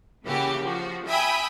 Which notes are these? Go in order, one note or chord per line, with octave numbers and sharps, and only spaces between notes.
C#3 E3 A#3 F#4 G4
F3 F#4
E5 G5 G#5 B5 D#6